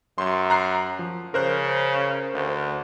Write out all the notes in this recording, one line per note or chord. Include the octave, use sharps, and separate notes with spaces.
F#2 C6
A#5 F#6 C7
F3
C#3 A#4 C5 F#6
D2